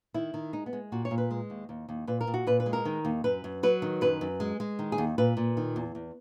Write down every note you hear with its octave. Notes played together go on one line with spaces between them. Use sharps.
D#3 E4
D#3
G#3 D#4
B3
G#3
A#2 F#4
C#5
A#2
B4
G#3
D#2
D#2
D#2
A#2 B4
A#4
A#2
F#4
A#2 B4
B4
G#3
A#4
D#3
D#2
F#2 B4
F#2
F#3 B4
D#3
F#2 B4
F#2
G#3
G#3
D#3
G#4
D#2
A#2 B4
A#2
D#3
E2
E2